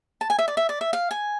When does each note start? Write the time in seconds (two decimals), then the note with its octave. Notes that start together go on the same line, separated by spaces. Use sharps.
0.21 A5
0.30 G#5
0.39 E5
0.48 D5
0.57 E5
0.69 D5
0.81 E5
0.93 F5
1.11 G#5